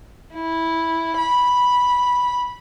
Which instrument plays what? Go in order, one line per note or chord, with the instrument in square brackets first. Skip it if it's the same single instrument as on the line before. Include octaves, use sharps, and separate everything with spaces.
[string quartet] E4
B5